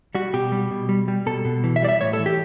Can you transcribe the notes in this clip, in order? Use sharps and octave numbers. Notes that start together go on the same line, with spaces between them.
G3 F#4
B2 G4
G3
B2
G3
G3
B2 A4
B2
E3
E5
G3 D5
E5
A2 C#5
A4
E3
G4